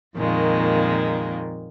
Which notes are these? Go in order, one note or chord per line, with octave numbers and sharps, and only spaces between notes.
F2 A#2 D#3 G#3 A#3